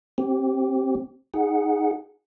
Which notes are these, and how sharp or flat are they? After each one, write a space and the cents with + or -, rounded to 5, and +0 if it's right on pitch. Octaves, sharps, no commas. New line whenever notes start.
C4 +20 G4 -15
D#4 +0 G#4 +0 F#5 +0